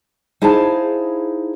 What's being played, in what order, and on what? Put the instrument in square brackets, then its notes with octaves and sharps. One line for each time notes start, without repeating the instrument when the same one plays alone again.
[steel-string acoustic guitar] D#4 E4 G#4 C5 F5 A5